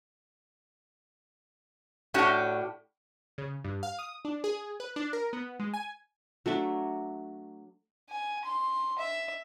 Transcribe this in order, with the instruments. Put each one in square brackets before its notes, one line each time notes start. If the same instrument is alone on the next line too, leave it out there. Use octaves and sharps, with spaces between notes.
[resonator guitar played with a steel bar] A2 C#4 D4 F#4 G4
[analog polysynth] C#3
G2
F5
D#6
D4
G#4
B4
D4
A#4
B3
G#3
G#5
[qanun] F#3 A3 D4 E5
[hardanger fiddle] G#5
C6
E5